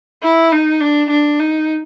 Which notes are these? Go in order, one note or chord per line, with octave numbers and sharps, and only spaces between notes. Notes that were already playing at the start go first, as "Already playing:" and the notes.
E4
D#4
D4
D4
D#4